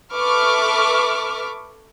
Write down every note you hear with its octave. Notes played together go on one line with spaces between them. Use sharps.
A4 B4 E5 C#6 D6 F6